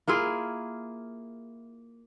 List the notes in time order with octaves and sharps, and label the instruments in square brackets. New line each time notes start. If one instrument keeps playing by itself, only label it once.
[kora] A#3 E4 F4 G#4